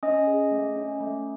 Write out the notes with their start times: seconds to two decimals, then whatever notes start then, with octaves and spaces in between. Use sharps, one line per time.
0.03 C#4 D#5 D#6
0.27 G#4
0.51 A3
0.76 C#4
1.00 A3